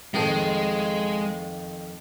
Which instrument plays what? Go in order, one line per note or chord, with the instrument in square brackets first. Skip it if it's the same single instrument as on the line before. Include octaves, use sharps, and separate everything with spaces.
[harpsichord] F2 D#3 F3 [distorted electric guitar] G#3